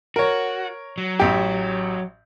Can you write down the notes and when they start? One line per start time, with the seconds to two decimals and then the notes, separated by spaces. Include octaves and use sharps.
0.16 F#4 A#4 C#5
0.98 F#3
1.20 A1 G4